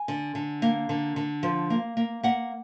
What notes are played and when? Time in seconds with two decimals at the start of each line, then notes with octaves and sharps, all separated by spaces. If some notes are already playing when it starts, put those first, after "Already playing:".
Already playing: G#5
0.08 D3
0.35 D3
0.62 A#3
0.89 D3
1.16 D3
1.43 F3
1.70 A#3
1.97 A#3
2.23 A#3 F#5